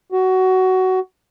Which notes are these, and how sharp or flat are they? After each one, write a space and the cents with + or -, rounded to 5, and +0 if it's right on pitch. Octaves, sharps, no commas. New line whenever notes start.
F#4 +15